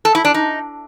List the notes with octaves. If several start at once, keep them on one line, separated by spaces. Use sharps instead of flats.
A4
E4
D4
D#4